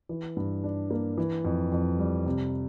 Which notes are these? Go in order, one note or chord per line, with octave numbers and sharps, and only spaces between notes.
E3
G2
D4
A#3
E3
F2
F2
G3
C3